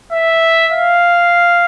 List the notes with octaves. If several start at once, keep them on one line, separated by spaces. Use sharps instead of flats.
E5
F5